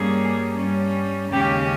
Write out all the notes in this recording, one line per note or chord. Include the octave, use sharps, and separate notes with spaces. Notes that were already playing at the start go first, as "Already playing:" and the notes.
Already playing: G2 G3 A#3 C#4 G#4
G2 G3 C#4
D#2 C#3 G#3 C#4 G4